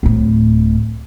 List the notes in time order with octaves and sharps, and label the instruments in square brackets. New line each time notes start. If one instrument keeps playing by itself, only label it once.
[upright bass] D1 A2